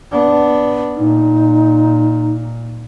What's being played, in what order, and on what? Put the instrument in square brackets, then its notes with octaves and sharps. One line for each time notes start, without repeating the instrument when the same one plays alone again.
[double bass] B3 D4
[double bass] A#2 [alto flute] D#4